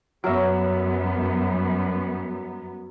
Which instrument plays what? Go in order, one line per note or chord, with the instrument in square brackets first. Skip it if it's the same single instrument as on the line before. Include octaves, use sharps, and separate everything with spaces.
[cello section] F#2 G3 B3 [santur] F#3 A#4 E5